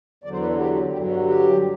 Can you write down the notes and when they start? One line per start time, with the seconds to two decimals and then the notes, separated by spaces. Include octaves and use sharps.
0.24 E2 D3 F#3 D5
0.32 C5
0.41 B4
0.50 A4
0.58 G4
0.92 G2 D3 F#3 G4
1.10 F#4
1.27 G4